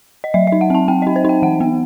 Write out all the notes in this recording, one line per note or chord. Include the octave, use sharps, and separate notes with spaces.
D#5
F#3 E5
E5
D#4
F#5
C4 A5
C4 G5
D#4 D#5
C5
D#4 G5
E3 F#5
B3